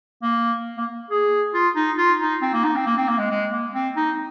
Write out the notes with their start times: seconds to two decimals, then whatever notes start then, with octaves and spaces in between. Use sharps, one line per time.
0.23 A#3
0.77 A#3
1.11 G#4
1.54 F4
1.76 D#4
1.98 F4
2.21 D#4
2.42 C4
2.54 A#3
2.65 D#4
2.76 C4
2.86 A#3
2.97 C4
3.08 A#3
3.19 G#3
3.31 G#3
3.52 A#3
3.74 C4
3.96 D#4